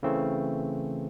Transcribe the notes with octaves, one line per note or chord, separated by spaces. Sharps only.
C#3 E3 A3 C4